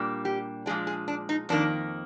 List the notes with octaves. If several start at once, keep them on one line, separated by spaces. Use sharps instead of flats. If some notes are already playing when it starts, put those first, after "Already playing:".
Already playing: A#2 G3 A#3 D4
G4
A#2 F3 G#3 D4 G#4
G#4
D4
D#4
F2 D#3 A#3 D4